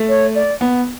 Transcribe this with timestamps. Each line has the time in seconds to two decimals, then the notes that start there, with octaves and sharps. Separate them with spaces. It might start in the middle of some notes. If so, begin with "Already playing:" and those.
Already playing: A3
0.08 C#5
0.35 D5
0.61 B3